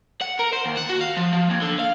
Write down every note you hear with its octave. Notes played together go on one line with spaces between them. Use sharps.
F#5
A#4
C5
D#2
F#5
F#4
F5
F3
F3
D#2
D3
F5